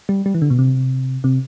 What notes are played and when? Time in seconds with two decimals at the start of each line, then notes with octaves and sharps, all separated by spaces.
0.09 G3
0.26 G3
0.34 E3
0.42 D3
0.50 B2
0.59 C3
1.24 C3